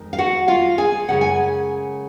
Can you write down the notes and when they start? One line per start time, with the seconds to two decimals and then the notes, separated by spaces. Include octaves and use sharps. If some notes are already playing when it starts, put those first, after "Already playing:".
Already playing: F2 D#3 G#3
0.13 F5
0.18 F#4 F#5
0.48 F4 F5
0.78 G#4 G#5
1.08 F#2 C#3 G#3 F#5
1.21 G#5